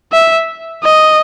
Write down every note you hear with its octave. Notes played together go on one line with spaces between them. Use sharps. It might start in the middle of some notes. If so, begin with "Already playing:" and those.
E5
D#5